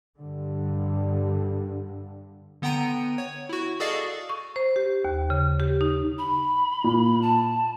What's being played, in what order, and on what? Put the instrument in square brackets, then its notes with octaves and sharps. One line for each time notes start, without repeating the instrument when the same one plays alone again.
[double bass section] G2 D3
[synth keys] D3 B3 F#5 G5 A#5 D#7
C#5
E4 F#4
F#4 G#4 A4 D5 D#5 F5
[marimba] C#6
C5
G4
D#2
C#3
G4
D#4
[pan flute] B5
[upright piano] A#2
[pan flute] A5